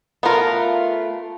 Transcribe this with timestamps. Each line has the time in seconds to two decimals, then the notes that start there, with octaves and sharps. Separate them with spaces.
0.23 A3 B3 F4 A#4